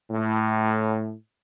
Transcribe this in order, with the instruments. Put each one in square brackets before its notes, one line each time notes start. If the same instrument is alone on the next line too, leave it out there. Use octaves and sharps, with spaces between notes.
[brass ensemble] A2